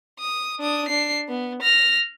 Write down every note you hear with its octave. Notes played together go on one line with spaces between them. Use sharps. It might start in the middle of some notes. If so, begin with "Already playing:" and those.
D#6
D4 D#6
D4 C7
B3
F6 A#6